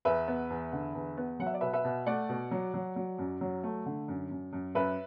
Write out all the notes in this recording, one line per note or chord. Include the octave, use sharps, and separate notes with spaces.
E2 B4 E5
B3
E2
D3
E2
B3
F#3 F#5
E5
D5
B2 B4 E5
B4 E5
B2
A3 D5 F#5
B2
F#3
F#3
F#3
F#2
F#3
A3
D3
F#2
F#2
F#2
F#2 B4 E5